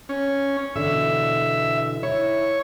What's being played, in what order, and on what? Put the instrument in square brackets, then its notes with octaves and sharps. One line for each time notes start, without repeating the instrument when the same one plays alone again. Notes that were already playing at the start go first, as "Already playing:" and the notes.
[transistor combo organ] C#4
[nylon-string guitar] B2 D3 E3 [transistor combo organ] E5
[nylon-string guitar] E4 [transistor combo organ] C#5